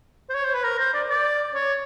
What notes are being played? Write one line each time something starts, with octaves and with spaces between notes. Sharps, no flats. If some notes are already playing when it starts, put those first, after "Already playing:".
C5
C#5
C5
B4
A#4
C5
D5
D5
C#5